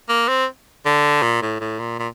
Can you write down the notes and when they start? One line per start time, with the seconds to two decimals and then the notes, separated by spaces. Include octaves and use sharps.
0.09 A#3
0.28 C4
0.86 D3
1.22 A#2
1.42 A2
1.60 A2
1.79 A#2
1.99 A#2